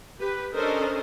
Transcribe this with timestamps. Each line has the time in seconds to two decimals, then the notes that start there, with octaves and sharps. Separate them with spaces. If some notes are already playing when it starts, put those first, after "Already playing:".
0.19 G4 B4
0.54 C#4 D4 A4 A#4 C5 D#5